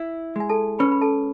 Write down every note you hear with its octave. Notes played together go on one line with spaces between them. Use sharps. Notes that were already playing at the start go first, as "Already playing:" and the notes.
Already playing: E4
G#3 G#5
A4 A5
C#4 B4 B5
B5
A4 A5